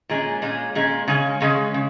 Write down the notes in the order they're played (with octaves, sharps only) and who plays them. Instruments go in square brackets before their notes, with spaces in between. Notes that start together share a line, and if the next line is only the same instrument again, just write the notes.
[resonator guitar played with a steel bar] A#2 G#3 C#4
A#2 G#3 C#4
A#2 G#3 C#4
C#3 G#3 C#4
C#3 G#3 C#4
C#3